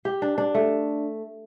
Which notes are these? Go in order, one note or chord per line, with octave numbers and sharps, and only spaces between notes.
G4
D4
D4
A3